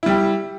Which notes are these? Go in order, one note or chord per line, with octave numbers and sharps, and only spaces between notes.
G3 E4 G4